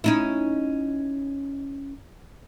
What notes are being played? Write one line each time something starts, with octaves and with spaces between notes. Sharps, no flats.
C#4 D#4 E4